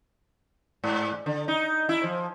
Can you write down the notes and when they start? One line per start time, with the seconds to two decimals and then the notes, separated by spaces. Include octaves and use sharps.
0.84 G#2
1.26 D3
1.48 D#4
1.89 E4
2.04 F3